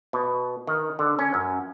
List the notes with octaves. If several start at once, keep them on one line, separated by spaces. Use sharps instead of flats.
B2
D#3
D3
C#4
F#2